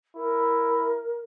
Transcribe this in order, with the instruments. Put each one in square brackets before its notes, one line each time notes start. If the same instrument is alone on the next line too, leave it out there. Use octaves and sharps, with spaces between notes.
[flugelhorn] E4 [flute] A#4